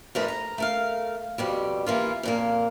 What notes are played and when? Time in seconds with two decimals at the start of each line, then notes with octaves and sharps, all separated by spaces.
0.15 F2 A2 A3 D#4 A#4 B4
0.28 A#5
0.58 A3 A#4 F5
1.38 F2 B2 G3
1.86 E3 A#3 F4
2.23 F2 A#2 A#3